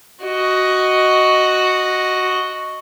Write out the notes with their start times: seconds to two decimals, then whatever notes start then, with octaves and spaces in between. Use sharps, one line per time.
0.23 F#4 D#5